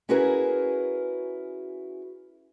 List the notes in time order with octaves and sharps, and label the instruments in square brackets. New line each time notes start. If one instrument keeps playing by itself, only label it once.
[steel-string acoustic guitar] C#4 E4 F#4 G#4 A#4 B4